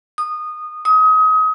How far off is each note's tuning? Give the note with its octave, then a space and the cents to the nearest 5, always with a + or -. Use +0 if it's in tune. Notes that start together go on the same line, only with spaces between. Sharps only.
D#6 -20
D#6 +30